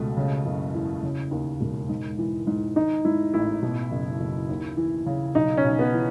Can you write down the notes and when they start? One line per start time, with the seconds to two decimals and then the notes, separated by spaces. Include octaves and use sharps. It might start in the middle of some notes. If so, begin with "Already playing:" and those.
Already playing: C#2 B2 A3
0.17 C#3
0.45 F#1
0.74 E2
1.03 C#3
1.31 D#2
1.61 E1
1.89 G#2
2.19 E3
2.47 G#2
2.76 D#3 D#4
3.05 G#2 E4
3.34 A1 E4
3.63 B2
3.92 F#1
4.20 F#1
4.49 D#2
4.77 E3
5.06 C#3
5.35 B1 D#4
5.57 C#4
5.64 B1
5.79 B3
5.93 E3